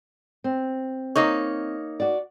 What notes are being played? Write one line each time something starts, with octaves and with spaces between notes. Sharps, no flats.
C4
A#3 D#4 C#5
F#4 D5